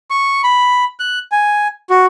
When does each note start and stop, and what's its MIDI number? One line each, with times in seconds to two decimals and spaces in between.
0.11 0.42 85
0.44 0.84 83
1.00 1.19 90
1.32 1.68 80
1.90 2.06 66